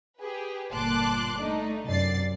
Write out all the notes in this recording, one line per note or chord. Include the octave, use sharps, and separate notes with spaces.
G4 G#4 B4
G1 A#2 A5 C6 D6 F#6
A3 D4 D#4
F#2 C3 D5 A6 C7